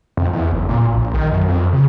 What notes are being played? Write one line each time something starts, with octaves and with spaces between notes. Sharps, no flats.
F2
E2
F#1
A#2
A#1
D#3
F#2
F2
C#3